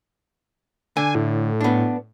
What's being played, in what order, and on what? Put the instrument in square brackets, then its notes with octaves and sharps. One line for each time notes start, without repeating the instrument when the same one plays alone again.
[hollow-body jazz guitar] D3 [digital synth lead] G#5
[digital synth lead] A2
[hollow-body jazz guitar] B3 D4